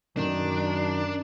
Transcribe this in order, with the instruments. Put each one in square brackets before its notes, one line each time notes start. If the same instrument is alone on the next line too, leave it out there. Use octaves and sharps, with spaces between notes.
[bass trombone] F#2 [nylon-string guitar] D#3 [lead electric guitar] D4